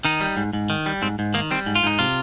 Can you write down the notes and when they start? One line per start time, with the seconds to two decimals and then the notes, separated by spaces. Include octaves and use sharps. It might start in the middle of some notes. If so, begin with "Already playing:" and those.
0.05 D#3 D#4
0.21 G3
0.37 G#2
0.53 G#2
0.70 D#3
0.86 G3
1.02 G#2 C4
1.19 G#2
1.34 D#3 A#3
1.51 G3 C4
1.66 G#2
1.75 F4
1.83 G#2 D#4
1.99 C3 F4